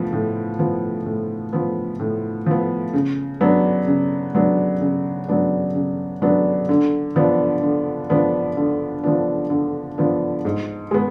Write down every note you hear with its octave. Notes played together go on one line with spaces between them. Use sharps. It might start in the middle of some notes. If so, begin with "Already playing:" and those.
Already playing: A2 F3 B3
A2
F3 B3
A2
F3 B3
A2
F3 B3
C#3
F#3 B3 D4
C#3
F#3 B3 D4
C#3
F#3 B3 D4
C#3
F#3 B3 D4
D3
F3 B3 D4
D3
F3 B3 D4
D3
F3 B3 D4
D3
F3 B3 D4
G#2
G#3 B3